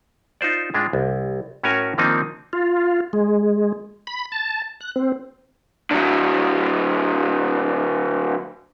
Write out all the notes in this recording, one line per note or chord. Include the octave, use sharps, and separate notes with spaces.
D#4 F4 C5 D5
A2 G#3 D4 F4
C2
A2 C#4 F#4 A#4 C#5 G#5
D#3 F3 A#3 C4 D4 D#4
F4
G#3
B5
A5
F#6
C4
D3 F#3